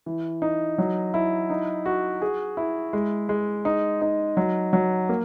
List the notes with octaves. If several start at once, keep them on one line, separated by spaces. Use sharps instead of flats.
E3
D#4
F#3
E4
D#4
F#4
G#4
E4
G#3
G#3
D#4
D#4
F#3
F#3
A#3